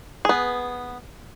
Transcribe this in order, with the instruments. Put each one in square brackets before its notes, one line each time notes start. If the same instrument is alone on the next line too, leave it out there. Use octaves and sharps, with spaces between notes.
[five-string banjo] B3 G#4